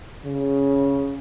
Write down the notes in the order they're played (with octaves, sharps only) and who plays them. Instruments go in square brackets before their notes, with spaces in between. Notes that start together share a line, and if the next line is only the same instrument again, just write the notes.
[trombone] C#3